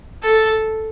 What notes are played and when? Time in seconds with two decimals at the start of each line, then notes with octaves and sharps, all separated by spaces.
0.23 A4